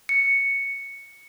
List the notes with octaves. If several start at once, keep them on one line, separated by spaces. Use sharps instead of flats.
C#7